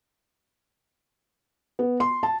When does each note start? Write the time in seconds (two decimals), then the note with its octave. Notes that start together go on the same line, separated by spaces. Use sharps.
1.79 B3
2.00 C6
2.23 A5